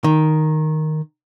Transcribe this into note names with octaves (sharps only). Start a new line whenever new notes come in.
D#3